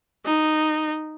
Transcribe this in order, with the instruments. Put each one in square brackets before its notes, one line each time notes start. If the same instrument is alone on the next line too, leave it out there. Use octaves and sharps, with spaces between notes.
[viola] D#4